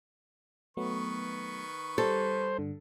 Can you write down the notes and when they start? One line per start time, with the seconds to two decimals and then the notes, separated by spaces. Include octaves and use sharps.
0.77 D#3 F#3 A3 B3 B4 C#6
1.98 G3 A4 C5
2.59 G2 D3